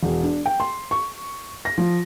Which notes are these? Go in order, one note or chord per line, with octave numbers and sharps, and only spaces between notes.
E1
D4
G5
C6
C#6
A#6
F3